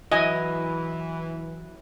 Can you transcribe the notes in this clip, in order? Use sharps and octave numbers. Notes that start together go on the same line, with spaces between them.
E3 F#3 E4 D#5 G#5